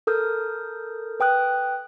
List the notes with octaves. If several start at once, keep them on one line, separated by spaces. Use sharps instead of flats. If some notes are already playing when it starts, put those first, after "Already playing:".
A4 A#4 D#6 F6 G6
B4 G5 D#6 F#6